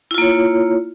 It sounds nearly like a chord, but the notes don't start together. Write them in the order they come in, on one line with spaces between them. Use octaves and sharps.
E4 F4 A#3 C#5